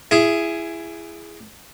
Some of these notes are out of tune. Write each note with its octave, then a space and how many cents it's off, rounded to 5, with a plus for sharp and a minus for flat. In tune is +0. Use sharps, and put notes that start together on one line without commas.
E4 +20 G#4 +0